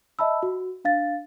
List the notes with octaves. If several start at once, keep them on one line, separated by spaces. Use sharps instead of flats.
D#5 E5 A5 B5 E6
F#4
D4 F5 A6